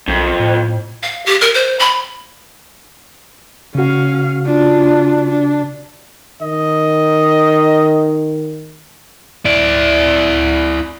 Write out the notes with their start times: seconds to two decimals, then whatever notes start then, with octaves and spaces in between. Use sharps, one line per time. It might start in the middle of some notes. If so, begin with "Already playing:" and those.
0.08 B1 F2
0.40 A2
1.03 F5
1.26 G4
1.41 A#4
1.54 C5
1.79 B5
3.75 C#3 C#4 F#4 F5
4.46 D4 F4
5.31 D4
6.42 D#3 D#5
9.45 E4 D5